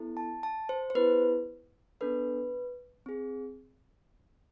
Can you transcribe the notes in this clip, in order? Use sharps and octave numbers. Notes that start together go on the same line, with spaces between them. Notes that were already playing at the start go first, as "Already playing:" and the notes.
Already playing: B3 E4 A4
A5
A5
C5
C5
B3 E4 G#4 B4
B3 D4 A4 B4
C4 G#4